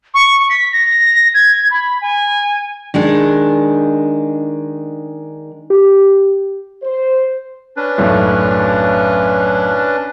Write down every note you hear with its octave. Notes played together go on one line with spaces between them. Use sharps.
C#6
B6
A#6
G#6
B5
G#5
D#3 G#3 D4 G#4
G4
C5
C#4 D4 B4
B1 F#2 A2